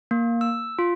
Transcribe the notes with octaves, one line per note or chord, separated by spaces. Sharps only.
A#3
E6
F4